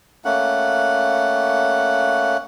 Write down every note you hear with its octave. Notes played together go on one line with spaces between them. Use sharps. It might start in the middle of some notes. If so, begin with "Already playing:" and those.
A3 A#3 C#4 F#5